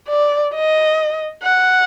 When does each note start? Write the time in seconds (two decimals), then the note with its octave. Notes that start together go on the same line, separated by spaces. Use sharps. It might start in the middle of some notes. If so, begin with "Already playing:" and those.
0.09 D5
0.54 D#5
1.44 F#5